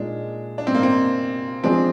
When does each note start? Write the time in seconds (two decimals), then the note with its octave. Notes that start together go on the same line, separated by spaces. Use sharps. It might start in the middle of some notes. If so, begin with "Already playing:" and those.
Already playing: A#2 G#3 D4 D#4 G#4
0.58 D4
0.67 C4
0.75 A#3
0.83 C4
1.64 F3 G#3 C4 D4 G#4